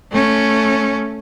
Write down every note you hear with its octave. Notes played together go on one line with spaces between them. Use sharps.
A3 C#4